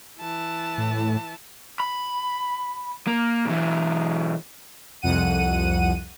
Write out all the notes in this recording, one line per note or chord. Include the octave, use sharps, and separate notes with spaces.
E3 A5
A2
B5
A#3
B1 E3
C2 F2 F#5 D#7